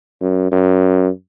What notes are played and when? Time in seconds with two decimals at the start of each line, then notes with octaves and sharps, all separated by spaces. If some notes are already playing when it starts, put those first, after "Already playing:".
0.21 F#2
0.52 F#2